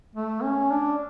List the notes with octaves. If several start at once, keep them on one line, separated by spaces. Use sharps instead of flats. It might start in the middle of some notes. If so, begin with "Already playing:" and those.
A3
C#4
D4